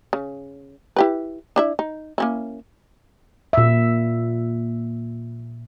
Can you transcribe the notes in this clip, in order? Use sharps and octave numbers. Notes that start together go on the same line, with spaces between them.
C#3
E4 G4 B4
D4 E4 E5
D#4
A#3 C#4 E4
A#2 E5